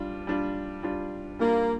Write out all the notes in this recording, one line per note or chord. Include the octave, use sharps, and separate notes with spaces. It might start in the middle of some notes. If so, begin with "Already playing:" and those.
Already playing: G3 D4 F4
G3 D4 F4
G3 D4 F4
G3 A#3 D4 F4